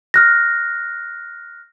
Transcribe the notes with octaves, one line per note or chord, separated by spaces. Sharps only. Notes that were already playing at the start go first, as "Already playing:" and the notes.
F6 F#6 A#6